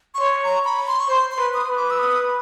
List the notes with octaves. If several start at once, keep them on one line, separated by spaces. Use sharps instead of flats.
C#6
C#5 C6
A#5
B5
C6
C#6
C5 C6
C6
B4
D#6
B4
D6
E6
D#6